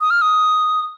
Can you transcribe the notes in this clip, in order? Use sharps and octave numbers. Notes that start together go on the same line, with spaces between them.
D#6
F6
D#6